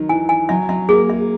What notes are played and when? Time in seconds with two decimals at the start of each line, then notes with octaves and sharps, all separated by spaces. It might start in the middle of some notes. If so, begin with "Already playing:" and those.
Already playing: D#3 F#3
0.09 E3 G#5
0.29 G#5
0.49 F#3 E5
0.69 F#3 E5
0.89 A#3 G#4
1.10 E5